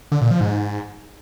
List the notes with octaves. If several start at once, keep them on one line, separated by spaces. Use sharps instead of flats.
D3
A#2
F3
G#2